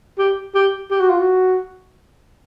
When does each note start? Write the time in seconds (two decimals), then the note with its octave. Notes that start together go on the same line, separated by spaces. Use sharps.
0.18 G4
0.55 G4
0.91 G4
1.00 F#4
1.10 F4
1.20 F#4